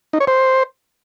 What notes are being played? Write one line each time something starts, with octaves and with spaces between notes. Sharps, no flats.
D#4
C#5
C5